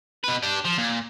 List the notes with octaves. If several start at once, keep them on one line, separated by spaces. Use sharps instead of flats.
B2 B4
D4 G4
F3
A#2